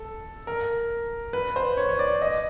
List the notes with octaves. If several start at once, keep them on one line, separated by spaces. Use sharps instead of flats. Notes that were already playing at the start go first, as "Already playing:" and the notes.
Already playing: A4
A#4
B4
C5
C#5
C#5
D5
D#5